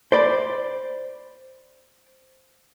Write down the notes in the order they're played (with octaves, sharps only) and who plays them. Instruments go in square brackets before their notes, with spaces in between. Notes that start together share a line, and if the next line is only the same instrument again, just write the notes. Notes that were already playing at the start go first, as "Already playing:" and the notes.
[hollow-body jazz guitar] C5 D5 B5